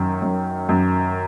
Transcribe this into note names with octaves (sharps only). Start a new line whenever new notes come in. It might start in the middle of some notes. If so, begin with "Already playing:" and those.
Already playing: F#2 D#3
F#2
F#2